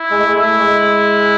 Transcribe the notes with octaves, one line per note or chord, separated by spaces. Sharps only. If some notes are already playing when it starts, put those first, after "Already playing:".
Already playing: E4
G#3
A3
G#3
A3 E4
G#3